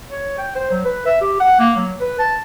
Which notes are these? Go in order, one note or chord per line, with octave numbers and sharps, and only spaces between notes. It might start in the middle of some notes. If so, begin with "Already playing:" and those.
C#5
G5
C5
F#3
B4
E5
G4
F#5
A#3
F#3
B4
A5